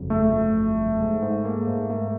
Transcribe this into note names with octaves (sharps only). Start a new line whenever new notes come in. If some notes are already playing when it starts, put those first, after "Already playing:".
Already playing: G1 F2 C#3 F#3
C#3 A3
F2
G1
G1
G#2
G#2
A#3
G#2
A#3